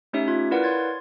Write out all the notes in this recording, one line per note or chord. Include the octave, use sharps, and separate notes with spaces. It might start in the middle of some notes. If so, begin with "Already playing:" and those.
A3 C#4 D#4 G4 C#5 E5
F4 G#6
E4 A#4 B4 D5 F5 F#5
C#5 C6 G#6 A6